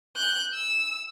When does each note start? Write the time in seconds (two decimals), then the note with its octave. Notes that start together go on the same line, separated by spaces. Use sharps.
0.17 F#6 G6
0.54 E6